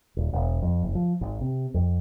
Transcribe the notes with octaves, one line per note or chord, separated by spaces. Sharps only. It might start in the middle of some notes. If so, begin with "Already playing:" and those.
D#1
E1
F2
F#1
F3
G#1
C3
F2